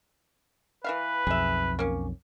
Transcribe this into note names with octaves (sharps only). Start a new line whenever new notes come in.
E3 B4 E5 F5
B1 F2 G#4 E5
A#3 C#4